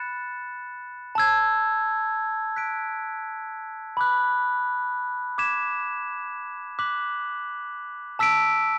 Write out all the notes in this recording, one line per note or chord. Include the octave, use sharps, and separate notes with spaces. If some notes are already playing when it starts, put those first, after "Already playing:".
Already playing: B5 F#6 A6 C#7 E7
A5 E6 G#6
F#6 B6 D7
B5 D6 F#6
D6 G#6 B6 E7
D6 F#6 B6 F#7
A5 E6 B6 D7